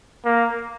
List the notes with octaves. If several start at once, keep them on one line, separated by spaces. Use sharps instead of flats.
A#3